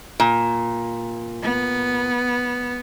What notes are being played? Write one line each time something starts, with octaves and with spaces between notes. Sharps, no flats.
A#2
B3